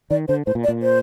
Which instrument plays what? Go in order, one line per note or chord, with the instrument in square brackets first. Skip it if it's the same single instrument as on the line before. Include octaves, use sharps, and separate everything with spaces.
[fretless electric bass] D#3 [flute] D5
[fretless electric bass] D3 [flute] C5
[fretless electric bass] A2 [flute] C5
[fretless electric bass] A#2
[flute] D5
[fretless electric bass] A#2
[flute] C5